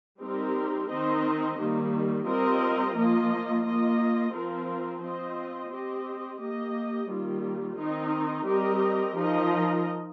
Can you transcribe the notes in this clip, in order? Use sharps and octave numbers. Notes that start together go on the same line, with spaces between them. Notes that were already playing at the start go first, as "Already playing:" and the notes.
G3 C4 D#4 G4 A#4
D#3 C4 D#4 C5 D#5
D#3 G3 A#3
G3 C4 F4 A#4 D#5
F3 A#3 F4 D#5
A#3 F4 D#5
F3 C4 F4 A#4
C4 F4 C5 D#5
C4 G4 D#5
A#3 G4 D#5
D#3 G3 A#3 F4
D#3 C4 D#4 A#4 D#5
G3 C4 G4 A#4 D#5
F3 D#4 A#4 D#5